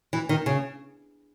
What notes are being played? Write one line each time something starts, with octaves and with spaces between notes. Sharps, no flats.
E3
D#3
C#3